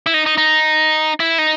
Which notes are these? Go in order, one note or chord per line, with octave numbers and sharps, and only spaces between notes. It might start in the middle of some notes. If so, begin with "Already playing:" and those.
E4
D#4
D#4
D#4
E4
D#4